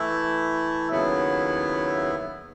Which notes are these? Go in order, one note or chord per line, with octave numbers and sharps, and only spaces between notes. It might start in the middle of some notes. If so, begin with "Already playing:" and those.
Already playing: E3 A3 E4
D#2 C#3 F#3 B3 E4